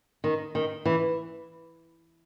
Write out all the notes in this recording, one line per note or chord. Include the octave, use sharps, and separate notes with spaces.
D#3
D#3
E3